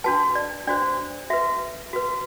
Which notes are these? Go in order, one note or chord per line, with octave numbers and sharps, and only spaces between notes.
D4 F#4 B4 A5
D5
D4 F#4 C5 D5
F#4 B4 E5
F#4 B4